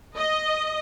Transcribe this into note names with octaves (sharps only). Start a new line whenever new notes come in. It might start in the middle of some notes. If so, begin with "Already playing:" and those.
D#5